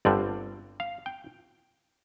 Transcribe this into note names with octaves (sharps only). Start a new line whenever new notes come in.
G1 G2 D3 G3 C4 D5
F5
G5